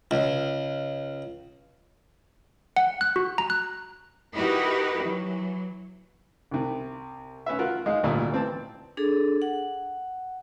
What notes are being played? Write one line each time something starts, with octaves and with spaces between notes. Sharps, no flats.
C#2
F#5
F#6
F#4
A#5
F#6
D#4 E4 F#4 G4 A#4 B4
E3 F#3
C2 C3
C#4 B4 E5
F4 F#4 A#4
G#3 D#4 F5
G#1 D2 A#2 G3
E3 C4 A5
D4 G#4 A4
F#5